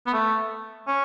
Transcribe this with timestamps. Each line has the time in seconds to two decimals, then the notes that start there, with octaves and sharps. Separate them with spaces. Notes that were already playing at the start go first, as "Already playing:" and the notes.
0.07 B3
0.13 A3
0.88 C#4